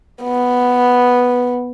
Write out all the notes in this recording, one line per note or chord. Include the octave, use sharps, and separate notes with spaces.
B3